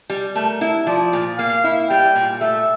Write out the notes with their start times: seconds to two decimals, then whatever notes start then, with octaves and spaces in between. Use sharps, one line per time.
0.10 G3
0.35 A3 A#4
0.61 E4
0.87 F3 D5
1.13 A#2
1.38 A#3 F5
1.64 E4
1.89 G3 G5
2.16 A#2
2.41 A3 E5